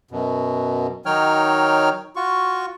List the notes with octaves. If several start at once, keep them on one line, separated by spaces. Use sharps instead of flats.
F#2 B2
D#3 F#3 D#4 C#5 G5 F6
F4 F#4 C#6